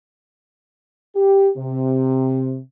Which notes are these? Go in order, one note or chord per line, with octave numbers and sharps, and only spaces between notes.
G4
C3